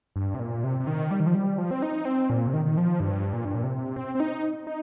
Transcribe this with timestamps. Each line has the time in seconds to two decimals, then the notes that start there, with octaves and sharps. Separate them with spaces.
0.16 G2
0.34 C3
0.40 A#2
0.64 C3
0.80 C3
0.87 D#3
1.11 G3
1.20 D#3
1.27 F3
1.35 G3
1.58 F3
1.71 C4
1.82 D#4
2.05 C4
2.30 A#2
2.47 C3
2.54 D#3
2.65 D#3
2.77 F3
3.00 G2
3.33 A#2
3.45 G2
3.55 A#2
3.64 C3
3.96 C4
4.15 C4
4.20 D#4
4.67 D#4